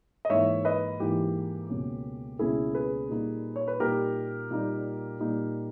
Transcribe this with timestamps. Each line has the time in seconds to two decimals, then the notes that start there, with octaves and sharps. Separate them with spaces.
0.25 D#5
0.30 G#2 E3 A#3 C#5 E5
0.65 B4 D#5
1.00 G#2 E3 A#3 G4
1.70 C#2 B2 A#3 C#4
2.39 C#2 B2 A#3 C#4 E4 G#4
2.75 G#4 B4
3.09 A#2 G3 A#3 D#4
3.56 C#5
3.68 B4
3.80 A#2 G3 A#3 D#4 G4 A#4
4.51 A#2 G3 A#3 D#4
5.20 A#2 G3 A#3 D#4